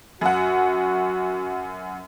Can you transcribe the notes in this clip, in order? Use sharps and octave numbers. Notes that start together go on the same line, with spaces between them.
F#2 F#4 F#5